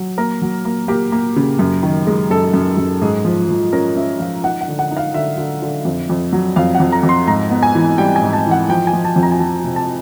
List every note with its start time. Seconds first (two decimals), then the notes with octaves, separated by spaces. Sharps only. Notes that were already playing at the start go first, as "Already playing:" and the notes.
Already playing: F#3
0.18 A#3 A#4
0.42 F#3
0.65 A#3
0.88 A#3 G4
1.12 A#3
1.36 C#3
1.59 F#2
1.83 D#3
2.07 G#3
2.30 F#2 A4
2.54 F#2
2.77 F#2
3.02 G#2 G#4
3.25 F3
3.49 F3
3.73 C#4 A#4
3.96 C#4 E5
4.19 F3 F5
4.44 D#4 F#5
4.61 F#5
4.68 D3
4.79 F#5
4.91 D#4
4.97 F5
5.14 D3 E5
5.38 D3
5.62 D3
5.85 F2
6.09 F2
6.32 F#3
6.56 F2 F5
6.75 F#5
6.80 F2
6.92 A#5
7.03 F2
7.09 C6
7.27 G#2 A#5
7.51 B3
7.63 G#5
7.75 E3
7.98 G3 G5
8.16 G#5
8.22 G#2
8.33 A5
8.46 E3
8.51 F#5
8.69 F3 G5
8.87 G#5
8.93 F3
9.05 A5
9.16 F2
9.23 A#5
9.32 G#5
9.40 F3 A5
9.64 C3
9.76 A5